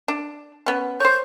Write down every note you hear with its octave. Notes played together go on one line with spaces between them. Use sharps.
D4
B3 C#4
C5 C#5 G6